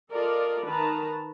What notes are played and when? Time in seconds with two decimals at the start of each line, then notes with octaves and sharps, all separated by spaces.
0.12 F4 A4 A#4 D5 D#5
0.65 D#3 B4 A5 A#5